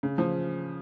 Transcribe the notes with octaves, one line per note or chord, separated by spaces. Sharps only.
C#3
F3